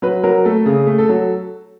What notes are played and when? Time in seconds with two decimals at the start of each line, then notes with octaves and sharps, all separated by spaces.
0.02 F#3 B4
0.24 F#3 A#4
0.45 A3 A4
0.66 C#3 G#4
0.87 A3
0.98 A4
1.09 F#3